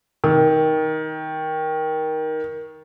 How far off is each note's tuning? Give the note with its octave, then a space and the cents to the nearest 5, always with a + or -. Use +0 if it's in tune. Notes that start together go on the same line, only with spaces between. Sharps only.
D#3 +15